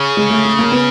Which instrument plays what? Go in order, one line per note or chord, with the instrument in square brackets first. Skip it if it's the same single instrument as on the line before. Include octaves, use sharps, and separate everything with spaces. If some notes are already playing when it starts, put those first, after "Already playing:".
Already playing: [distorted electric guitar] C#3
[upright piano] G#3
A3
A3
A#3
B3